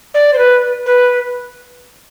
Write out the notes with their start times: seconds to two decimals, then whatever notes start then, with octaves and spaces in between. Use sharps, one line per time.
0.14 D5
0.33 C5
0.38 B4
0.86 B4